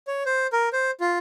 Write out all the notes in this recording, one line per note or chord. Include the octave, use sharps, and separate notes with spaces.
C#5
C5
A#4
C5
F4